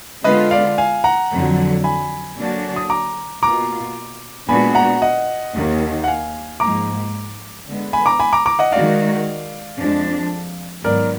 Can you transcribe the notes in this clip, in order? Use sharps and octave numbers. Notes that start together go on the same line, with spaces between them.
D3 G#3 B3 F4 B4 D#5
D5 F5
F5 G#5
F#5 A#5
F2 D3 F#3
G#5 B5
D3 F#3 A#3 D4 F#4
D#6
A#5 D6
B2 A#3 F4 A#5 D6
A#2 G#3 B3 D4 F#4 G#5 B5
F#5 A#5
D#5 F#5
D#2 D#3 A#3
F#5
F5 G#5
G#2 F3 A#3 A#5 D6
D3 G#3 B3
G#5 B5
A#5 D6
G#5 B5
A#5 D6
A#5 D6
D#5 F#5
D#3 G#3 D#4 F#4 D5 F5
F2 F3 G#3 D4
G#2 D#3 F#3 B3 A#4 D5